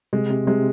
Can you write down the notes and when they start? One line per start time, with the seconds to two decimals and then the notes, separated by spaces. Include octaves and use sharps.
0.13 C3 G#3
0.31 C3
0.47 C3 G#3